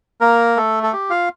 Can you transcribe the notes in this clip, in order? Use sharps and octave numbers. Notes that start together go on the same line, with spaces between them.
A#3 A#4
A3 A4
A4
G4
F4 F5